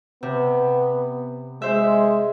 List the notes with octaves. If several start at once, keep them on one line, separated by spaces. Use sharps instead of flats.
C3 B3
G#3 C5 E5